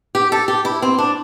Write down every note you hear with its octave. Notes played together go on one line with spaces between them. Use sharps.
G4
A4
G4
E4
C4
D4